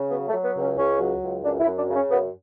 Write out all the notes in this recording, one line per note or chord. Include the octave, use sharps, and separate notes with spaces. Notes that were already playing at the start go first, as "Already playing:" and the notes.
Already playing: C#3
F#3 B3
A3
F#3
B3
C#2
C#4
C#2 C#4
F#3
C#2
F#2 D4
E4
F#2
D4
C#3
C#4
F#2 B3